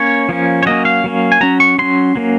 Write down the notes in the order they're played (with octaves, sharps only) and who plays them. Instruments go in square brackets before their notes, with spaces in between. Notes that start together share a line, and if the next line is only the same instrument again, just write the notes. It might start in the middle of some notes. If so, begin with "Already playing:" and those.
Already playing: [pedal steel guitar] A#3 C#4 C#5
F3 A#3 C#4
C#5
F#3 A#3 C#4 D#5
F5
F#3 A#3 C#4
G#5
F#3 C#4 A#5
C#6
F#3 C#4 C6
F#3 A#3 C#4